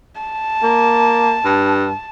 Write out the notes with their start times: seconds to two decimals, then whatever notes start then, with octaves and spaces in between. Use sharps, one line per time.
0.20 A5
0.63 A#3
1.45 G2